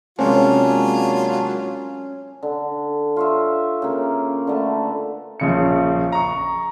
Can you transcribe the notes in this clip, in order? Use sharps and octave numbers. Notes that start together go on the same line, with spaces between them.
C3 F#3 G#3 A#3 C#4 D4 F4
D3
F4 C#5 E5
C#3 A#3
D3 A3 B4
A#1 C#3 C#7
A#5 C#6